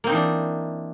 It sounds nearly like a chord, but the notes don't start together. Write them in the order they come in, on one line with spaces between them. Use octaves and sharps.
A#3 C4 D#4 E3 D4